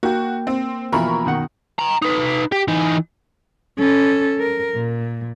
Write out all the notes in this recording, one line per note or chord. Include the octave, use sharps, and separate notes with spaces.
A#3 F#4 G5
C4
B2 E3 F3 A#4 B5 C#6
B2 D#3 F#5
G5 A#5
D#4 B4
G4
E3 D#4
C#4 A4
A#4
A#2